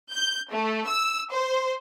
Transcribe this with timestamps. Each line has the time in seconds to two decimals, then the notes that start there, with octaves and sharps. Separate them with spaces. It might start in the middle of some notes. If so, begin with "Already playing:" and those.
0.11 G6
0.51 A3
0.87 E6
1.31 C5